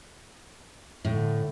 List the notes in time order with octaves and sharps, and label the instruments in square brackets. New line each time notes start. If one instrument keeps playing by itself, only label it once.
[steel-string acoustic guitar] A2 [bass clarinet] D3